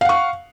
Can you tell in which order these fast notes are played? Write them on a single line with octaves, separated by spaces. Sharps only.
F5 F#5 C#6